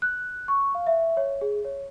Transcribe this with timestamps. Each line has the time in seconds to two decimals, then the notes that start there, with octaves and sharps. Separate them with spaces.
0.02 F#6
0.48 C#6
0.75 F5
0.87 E5
1.17 C#5
1.41 G#4
1.65 C#5